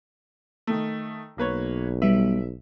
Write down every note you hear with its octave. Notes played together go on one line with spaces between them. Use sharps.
D#3 A3
B1 A#3 B4 C#5
G3 B3 E5